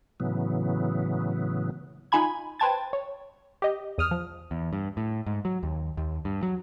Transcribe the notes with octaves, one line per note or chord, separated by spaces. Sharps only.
A2 C#3 E3 F#3 B3
D#4 F4 G#5 B5 G#6
B4 C5 G5 A5 G#6 A6
C#5
G4 D#5
E2 D#6 F6
F3
E2
G2
A2
G#2
F#3
D#2
D#2
G2
F#3